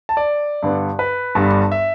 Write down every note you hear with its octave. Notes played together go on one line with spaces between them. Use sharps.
A5
D5
G2 D3 B3
B4
G1 G2 G3
E5